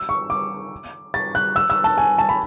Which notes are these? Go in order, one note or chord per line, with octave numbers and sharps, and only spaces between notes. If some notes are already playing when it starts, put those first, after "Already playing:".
Already playing: E6
C#6
D6
A6
F#6
E6
E6
A5
G#5
A5
B5